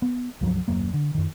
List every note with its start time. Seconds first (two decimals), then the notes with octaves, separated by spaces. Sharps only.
0.02 B3
0.41 C#2 G2 F3 F#3
0.68 D#1 F#2 A#3
0.94 D3
1.15 F#2 D#3